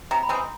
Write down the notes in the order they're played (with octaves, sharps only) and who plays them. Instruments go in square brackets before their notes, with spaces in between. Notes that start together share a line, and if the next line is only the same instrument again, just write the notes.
[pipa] C3 [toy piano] A#5
[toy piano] B5
[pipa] E3 G#3 C4
[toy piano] C6